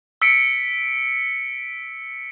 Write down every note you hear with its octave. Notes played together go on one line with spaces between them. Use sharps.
E6 B6 C#7 D7